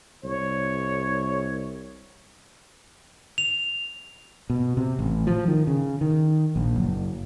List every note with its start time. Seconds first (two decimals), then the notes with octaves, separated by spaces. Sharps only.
0.24 C2 C#5
3.38 F7
4.50 B2
4.77 C3
4.99 A1
5.27 F3
5.48 D#3
5.67 C#3
6.01 D#3
6.56 A#1
6.76 F#1